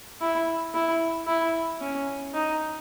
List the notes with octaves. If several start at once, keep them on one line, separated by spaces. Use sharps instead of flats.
E4
E4
E4
C#4
D#4